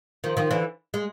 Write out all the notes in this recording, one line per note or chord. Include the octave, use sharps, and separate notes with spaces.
D#3 F3
D#3 F3
D3 E3
G#3